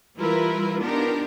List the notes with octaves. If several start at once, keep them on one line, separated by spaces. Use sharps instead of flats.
E3 G3 E4 F4 A#4 B4
B3 D4 D#4 F4 G4 A#4